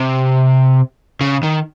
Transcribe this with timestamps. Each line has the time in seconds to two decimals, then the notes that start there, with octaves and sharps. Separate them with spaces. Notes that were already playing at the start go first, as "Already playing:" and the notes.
Already playing: C3
1.21 C#3
1.43 D#3